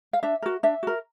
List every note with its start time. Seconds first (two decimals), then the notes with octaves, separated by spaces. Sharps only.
0.13 F5
0.23 D4 E5
0.42 F#4 A#4
0.63 D4 E5
0.83 F#4 A#4